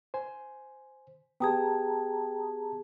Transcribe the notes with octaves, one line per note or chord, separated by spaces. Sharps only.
C5 G#5
B3 G4 G#4 G5 A5 A#5 D#6